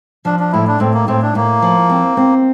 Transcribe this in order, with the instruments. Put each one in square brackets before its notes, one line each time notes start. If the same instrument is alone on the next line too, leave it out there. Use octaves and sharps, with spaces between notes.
[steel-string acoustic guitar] F3 [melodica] D4
[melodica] D4
[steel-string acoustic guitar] A2 [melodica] E4
[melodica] D4
[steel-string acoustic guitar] A2 [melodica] C4
[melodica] A#3
[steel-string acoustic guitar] A2 [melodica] C4
[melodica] D4
[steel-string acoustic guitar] A2 [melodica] A#3
[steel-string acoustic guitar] F3
C4
C4